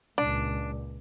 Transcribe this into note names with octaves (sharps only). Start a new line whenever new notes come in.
C#2 A#2 D4